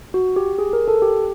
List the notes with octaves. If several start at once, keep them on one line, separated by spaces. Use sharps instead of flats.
F#4
G4
G#4
A#4
A4
G4